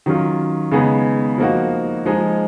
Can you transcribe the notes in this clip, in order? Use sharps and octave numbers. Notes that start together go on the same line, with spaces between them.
D#3 F#3 C#4 F4
C#3 G#3 B3 D#4 G#4
F3 A#3 D#4 F#4
F3 G#3 D#4 G#4